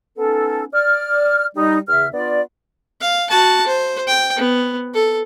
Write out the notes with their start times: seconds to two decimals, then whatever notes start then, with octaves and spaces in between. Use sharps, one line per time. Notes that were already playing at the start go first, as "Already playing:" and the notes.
0.17 B3 C#4 D#4 A4
0.73 D5 F6
1.55 G3 D#4
1.88 E2 C#3 E5 F6
2.13 B3 D4 F4 D5
3.01 F5
3.30 F#4 A5
3.67 C5
4.07 G5
4.36 B3
4.94 A4